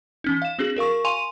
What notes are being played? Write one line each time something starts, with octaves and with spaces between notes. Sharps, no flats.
E3 C#4 D#4
F5 E7
C4 D4 F#4 G#4
F#4 A#4 F5 C#6
F5 G#5 C6 D#7 F7